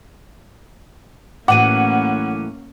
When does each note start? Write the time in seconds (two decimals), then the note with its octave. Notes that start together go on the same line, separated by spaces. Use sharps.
1.48 A2 E3 F#3 A#3 C#4 F#5 D6 D#7